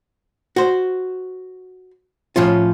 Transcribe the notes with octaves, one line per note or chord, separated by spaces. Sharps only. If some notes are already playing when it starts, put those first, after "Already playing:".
F#4 C5
A2 F3 C#4 F4